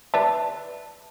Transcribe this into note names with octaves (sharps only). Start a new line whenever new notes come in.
B4 D5 E5 A5